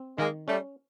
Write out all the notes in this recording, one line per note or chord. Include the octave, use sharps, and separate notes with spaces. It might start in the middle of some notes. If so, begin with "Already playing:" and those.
Already playing: C4
D#3 G#3 A#3
G3 A3 C#4